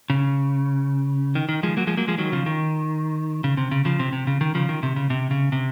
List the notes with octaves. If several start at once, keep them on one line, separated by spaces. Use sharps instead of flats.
C#3
D#3
D#3
F3 G#3
F#3 A#3
F3 G#3
F#3 A#3
F3 G#3
D#3 F#3
C#3 F3
D#3
C#3
C3
C#3
C#3 F3
C3
C3
C#3
D#3
C#3 F3
D#3
C3
C#3
C3
C#3
C3